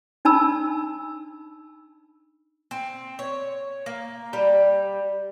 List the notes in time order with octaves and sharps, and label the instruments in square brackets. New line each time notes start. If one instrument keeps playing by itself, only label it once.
[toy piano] D4 D#4 A5 B5 E6
[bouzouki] C4
C#5
A#3
G3